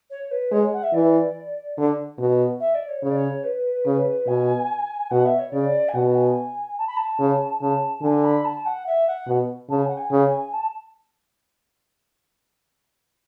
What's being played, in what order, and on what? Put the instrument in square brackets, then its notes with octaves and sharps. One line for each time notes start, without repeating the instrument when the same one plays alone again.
[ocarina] C#5
B4
[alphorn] G#3 [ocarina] C#5
[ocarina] F#5
E5
[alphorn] E3 [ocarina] D5
[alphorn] D3
B2
[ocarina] E5
D5
C#5
[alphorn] C#3 [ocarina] C#5
[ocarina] D5
C#5
B4
[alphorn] C#3
[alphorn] B2 [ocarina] G#5
[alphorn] B2 [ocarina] F#5
[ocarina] E5
C#5
[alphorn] C#3 [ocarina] D5
[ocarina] G#5
[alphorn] B2 [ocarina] F#5
[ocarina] G#5
A5
B5
A5
[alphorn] C#3
[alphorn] C#3 [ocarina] A5
[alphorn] D3 [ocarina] G#5
[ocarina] B5
A5
F#5
E5
F#5
[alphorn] B2
[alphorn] C#3 [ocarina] A5
[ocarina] G#5
F#5
G#5
[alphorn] C#3
[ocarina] A5